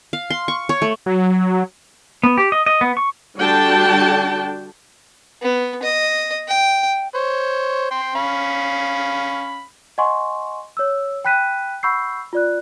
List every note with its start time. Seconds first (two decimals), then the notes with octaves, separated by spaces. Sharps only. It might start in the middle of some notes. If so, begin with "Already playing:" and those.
0.13 F5
0.30 C6
0.48 C#6
0.69 C#5
0.82 A3
1.06 F#3
2.23 B3
2.38 G4
2.52 D#5
2.66 D#5
2.81 B3
2.97 C#6
3.37 D3 G3 D4 F#4 G5 A5
5.42 B3
5.83 D#5
6.48 G5
7.15 C5 C#5
7.91 G5 C6
8.15 C#4 F5 B5
9.98 D#5 F#5 G#5 C6 C#6
10.77 C#5 E6
11.25 G5 B5 F#6 B6 D#7
11.83 F#5 B5 C#6 E6 G6 C7
12.33 F4 D5 F#6